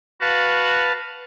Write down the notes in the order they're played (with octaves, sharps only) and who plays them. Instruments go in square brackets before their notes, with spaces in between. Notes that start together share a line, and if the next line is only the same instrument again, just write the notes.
[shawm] F#4 [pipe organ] B4 F5 A5